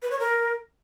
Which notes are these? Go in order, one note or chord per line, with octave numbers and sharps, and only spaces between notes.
B4
C#5
A#4